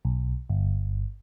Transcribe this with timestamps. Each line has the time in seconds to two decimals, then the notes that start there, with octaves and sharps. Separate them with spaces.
0.05 B1
0.50 G1